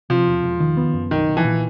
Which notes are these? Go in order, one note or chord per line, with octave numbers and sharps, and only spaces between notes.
C3 F3
E1
E1
D#3
B3
F#2
B1 D#3
B1
E3
A#2